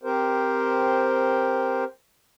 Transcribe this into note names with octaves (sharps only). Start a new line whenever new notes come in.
C4 G4 A#4 C5